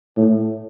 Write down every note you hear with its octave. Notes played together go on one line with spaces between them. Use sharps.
A2